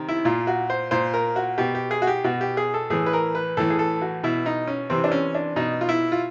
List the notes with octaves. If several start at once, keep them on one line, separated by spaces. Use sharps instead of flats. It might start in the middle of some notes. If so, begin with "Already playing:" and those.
Already playing: C3 D#3
E4
A#2 F4
F#4
C5
A#2 C5
A#4
F#4
B2 G4
G4
G#4
F#4
G4
B2 F#4
G4
G#4
A4
A2 E3 G#4
B4
A#4
B4
A2 E3 A4
G#4
A4
F#4
B2 E4
D#4
C#4
C3 E3 C4
D4
C#4
D4
B2 D#4
F4
E4
F4